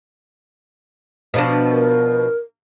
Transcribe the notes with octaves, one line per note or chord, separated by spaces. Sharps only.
B2 F3 D4
A#4